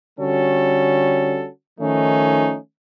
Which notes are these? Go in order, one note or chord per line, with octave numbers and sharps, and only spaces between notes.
D3 G3 C#4 F#4 A4
D#3 F3 A3 C#4 D#4